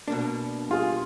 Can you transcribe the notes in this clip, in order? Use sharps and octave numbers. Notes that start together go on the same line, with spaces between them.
B2 A#3 D4
G3 F4 G#4